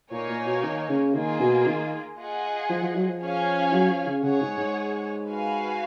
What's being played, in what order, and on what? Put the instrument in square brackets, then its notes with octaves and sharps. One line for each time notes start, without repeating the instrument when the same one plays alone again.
[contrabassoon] A#2 [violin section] A#3 D#4 A#4 C#5 G#5
[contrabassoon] A#2
B2
D#3
C#3
[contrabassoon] D#3 [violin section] A#3 F4 G#4
[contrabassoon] B2
D#3
[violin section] F4 G#4 D#5 F#5
[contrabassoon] F3
F3
F#3
F3
[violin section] C#4 G#4 C#5 F5 G#5
[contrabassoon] F#3
F3
C#3
[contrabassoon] C#3 [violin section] G#4 C#5 F#5
[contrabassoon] G#2
G#2
[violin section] F#4 B4 F5 G#5